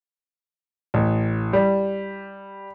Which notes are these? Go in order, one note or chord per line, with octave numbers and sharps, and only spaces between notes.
A1
G3